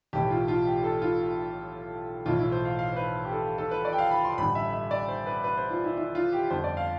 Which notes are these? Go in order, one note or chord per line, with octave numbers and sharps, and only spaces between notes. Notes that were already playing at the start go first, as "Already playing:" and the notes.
B1 A2 E3 G4
F4
F4
G4
A4
F4
B1 A2 E3 F4
E4
C5
F5
F5
C5
B4
G4
A4
A4
B4
D5
G5
F5
B5
C6
A1 G2 D3 B5
E5
E5
D5
C5
B4
B4
C5
F4
E4
E4
F4
G4
G1 F2 D3 C5
D5
F5